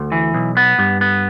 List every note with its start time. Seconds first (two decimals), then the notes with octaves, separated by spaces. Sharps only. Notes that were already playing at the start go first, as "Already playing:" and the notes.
Already playing: D2
0.12 E3
0.34 B1
0.57 B3
0.79 G2
1.01 B3